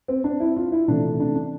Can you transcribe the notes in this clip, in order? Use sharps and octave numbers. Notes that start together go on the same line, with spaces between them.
C4
D4
E4
F4
E4
C3 E3 A3 D4
D4
D4